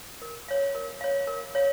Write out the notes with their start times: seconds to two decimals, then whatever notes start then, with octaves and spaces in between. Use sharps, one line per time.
0.22 A#4
0.48 C#5 F5
0.75 A#4
1.01 C#5 F5
1.27 A#4
1.55 C#5 F5